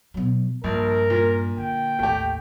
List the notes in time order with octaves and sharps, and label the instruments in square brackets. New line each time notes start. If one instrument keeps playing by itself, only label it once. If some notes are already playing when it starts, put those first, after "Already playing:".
[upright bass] B2 F#3
[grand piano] A#1 [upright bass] G2 [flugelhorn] A#4
[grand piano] A#2
[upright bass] D3 [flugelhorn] G5
[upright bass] A1 D#2 [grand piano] A3 G4